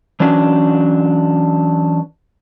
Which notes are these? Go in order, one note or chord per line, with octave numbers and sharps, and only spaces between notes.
E3 F#3 C#4 D4